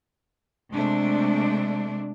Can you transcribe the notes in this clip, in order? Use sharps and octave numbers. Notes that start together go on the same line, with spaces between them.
C3 G#3 A3 D4